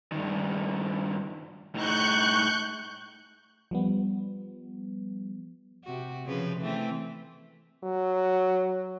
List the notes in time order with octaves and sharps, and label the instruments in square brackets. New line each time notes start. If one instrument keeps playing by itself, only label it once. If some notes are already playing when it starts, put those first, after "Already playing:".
[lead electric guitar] G2 D#3
[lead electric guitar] A2 D#4 [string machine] C#6 F#6 G6
[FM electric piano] F3 G3 B3
[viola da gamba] C3 F#4
C#3 F3 B4
E3 A3 C4
[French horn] F#3